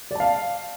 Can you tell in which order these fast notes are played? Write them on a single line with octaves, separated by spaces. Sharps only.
D5 A5 F5